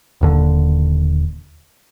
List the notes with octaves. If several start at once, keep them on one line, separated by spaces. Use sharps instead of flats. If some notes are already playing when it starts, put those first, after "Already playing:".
D#1 D#2 D3